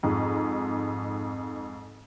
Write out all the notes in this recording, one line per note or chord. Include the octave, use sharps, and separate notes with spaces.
F2 G#2